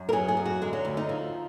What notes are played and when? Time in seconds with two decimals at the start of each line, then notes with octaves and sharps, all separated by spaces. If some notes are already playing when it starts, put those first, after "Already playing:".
Already playing: F#2
0.09 A#4
0.13 F#3 G#4
0.28 G#4
0.37 F#2
0.45 F#4
0.62 D3 G#3
0.73 F#3
0.85 D2
0.97 D#4
1.09 F3